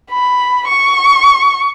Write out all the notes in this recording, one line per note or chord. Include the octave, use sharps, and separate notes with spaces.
B5
C#6